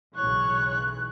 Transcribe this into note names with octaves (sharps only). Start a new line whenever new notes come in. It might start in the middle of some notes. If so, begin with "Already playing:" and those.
B1 C#3 E3 C#5 C#6 F#6